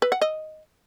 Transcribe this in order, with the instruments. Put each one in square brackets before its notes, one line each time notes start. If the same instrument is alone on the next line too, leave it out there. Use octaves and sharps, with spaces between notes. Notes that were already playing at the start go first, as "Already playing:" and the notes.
[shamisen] B4
F#5
D#5